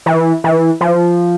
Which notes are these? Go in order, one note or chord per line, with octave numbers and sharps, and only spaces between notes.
E3
E3
F3